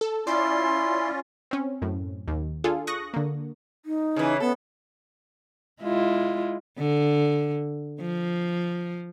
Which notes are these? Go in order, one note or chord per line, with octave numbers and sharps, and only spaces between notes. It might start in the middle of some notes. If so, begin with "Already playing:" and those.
A4
C#4 E4 F4 D5 C6
C4 C#4
F#2 A2
D#2
D4 F4 G#4 A4
C#6 D#6 F#6 A#6
D3 A#3
D#4
C#3 E3
B3 A4
G#3 E4 F4
D3
F3